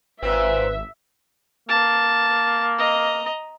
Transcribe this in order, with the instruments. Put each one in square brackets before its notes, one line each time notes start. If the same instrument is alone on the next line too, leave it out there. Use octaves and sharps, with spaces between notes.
[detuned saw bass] G#1 [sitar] A#2 C4 [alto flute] B4 [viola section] E5
[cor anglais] A#3 [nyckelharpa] A5
[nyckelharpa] D#5 A#5